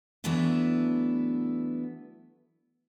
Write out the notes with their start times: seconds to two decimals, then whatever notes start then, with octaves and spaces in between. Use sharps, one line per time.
0.24 E3 F#3 A3 B3 D4 E4